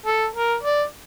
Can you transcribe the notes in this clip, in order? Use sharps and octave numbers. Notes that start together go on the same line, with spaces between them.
A4
A#4
D5